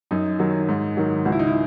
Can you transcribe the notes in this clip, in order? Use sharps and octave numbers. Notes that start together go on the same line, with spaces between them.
F#2 D#4
D#3 F#3
G#2
D#3 F#3
C#2 F#4
E4
D#4
E4